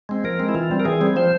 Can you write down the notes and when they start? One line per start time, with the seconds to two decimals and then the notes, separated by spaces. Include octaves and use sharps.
0.09 G#3 C4
0.24 F3 A#4
0.39 G#3 C4
0.49 E4
0.54 E3 F4
0.71 G3 C4
0.80 A#4
0.85 E3 G#4
1.01 G3 C4
1.16 F3 C5